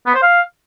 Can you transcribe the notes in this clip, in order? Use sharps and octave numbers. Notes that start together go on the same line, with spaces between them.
B3
C5
F5